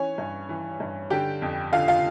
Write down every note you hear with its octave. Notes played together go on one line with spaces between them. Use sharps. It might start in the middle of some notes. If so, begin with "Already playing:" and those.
Already playing: E3 C#4 C#5
G2
E3
G2
D3 G4 G5
F2
D3 F4 F5
F4 F5